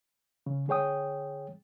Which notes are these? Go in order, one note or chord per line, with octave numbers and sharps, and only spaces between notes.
C#3
D3 G#4 C#5 G5 D#6